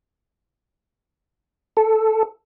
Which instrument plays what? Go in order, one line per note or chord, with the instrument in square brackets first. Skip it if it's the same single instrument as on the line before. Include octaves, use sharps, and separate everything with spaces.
[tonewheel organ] A4